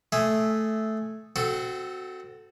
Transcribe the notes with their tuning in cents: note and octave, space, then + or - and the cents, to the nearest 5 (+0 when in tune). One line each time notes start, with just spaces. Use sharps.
A3 -5 G#4 +0 E5 +0
C4 -20 F#4 +0 A4 +0